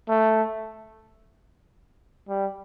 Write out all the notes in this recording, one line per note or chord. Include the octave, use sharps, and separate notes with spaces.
A3
G3